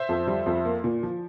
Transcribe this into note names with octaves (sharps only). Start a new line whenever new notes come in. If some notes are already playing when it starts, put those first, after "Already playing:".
Already playing: C5 E5
F2
G3
F2
A#3
A#2
F3